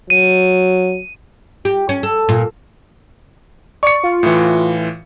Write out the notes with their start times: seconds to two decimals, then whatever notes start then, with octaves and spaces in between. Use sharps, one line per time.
0.10 F#3 D#7
1.65 G4
1.89 C#4
2.03 A4
2.29 A#2
3.83 D5 C#6 C#7
4.04 F4
4.23 A2 E3